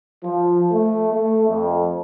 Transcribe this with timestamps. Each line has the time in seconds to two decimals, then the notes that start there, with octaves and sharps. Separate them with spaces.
0.24 F3
0.72 A3
1.13 A3
1.49 F2